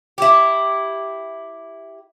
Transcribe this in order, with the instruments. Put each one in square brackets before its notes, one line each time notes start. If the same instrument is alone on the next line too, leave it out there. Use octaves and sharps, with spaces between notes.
[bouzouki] E4 G4